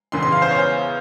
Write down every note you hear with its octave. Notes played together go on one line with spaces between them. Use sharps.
E2 C#3 E3 C6
C6
F5
C5
C#5
C5